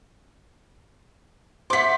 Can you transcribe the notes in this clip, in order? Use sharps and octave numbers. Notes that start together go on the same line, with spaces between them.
C5 E5 F#5 C6 D6 B6